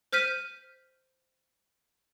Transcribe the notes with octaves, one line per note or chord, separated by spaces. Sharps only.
C5 F6 G6 B6 D#7